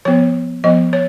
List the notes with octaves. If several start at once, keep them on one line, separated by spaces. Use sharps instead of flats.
F3 B3 C#5
F3 B3 D#5
C#5